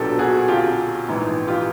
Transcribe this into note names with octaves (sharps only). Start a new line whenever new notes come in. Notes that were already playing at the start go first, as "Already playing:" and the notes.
Already playing: B1 A#2 F#3 B3 D4 G4 A4
F#4 G#4
F4 G4
A#1 G#2 E3
F4 G4